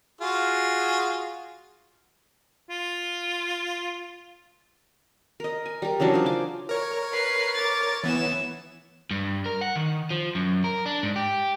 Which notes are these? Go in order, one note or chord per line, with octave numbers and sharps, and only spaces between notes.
F4 F#4 G#4
F4
A#4 D#5
G#5
G3 A#4
C#3 E3 F#3 D4
F4 C5
G#5 D6
A#4 C#5
B4 C7
D6 A6
E3 B3 C#5 E7
G2
A#4
F#5
D#3
F3
F#2
A#4
D4
G#2
G4